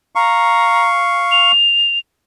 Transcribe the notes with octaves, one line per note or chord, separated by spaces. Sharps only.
F5 A#5 C#6
F7